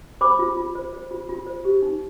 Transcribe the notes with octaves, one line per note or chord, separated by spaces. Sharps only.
C5 B5 D6
F4
F4
C5
C5
F4
F4
C5
G4
D#4